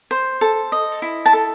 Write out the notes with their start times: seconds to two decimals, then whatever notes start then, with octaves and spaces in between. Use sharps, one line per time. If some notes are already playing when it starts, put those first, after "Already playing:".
0.11 C5
0.41 A4
0.72 D#5
1.02 E4
1.26 A5
1.33 A4